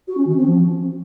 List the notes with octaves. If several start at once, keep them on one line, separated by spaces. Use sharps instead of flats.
F#4
C#4
D#3
C4
F3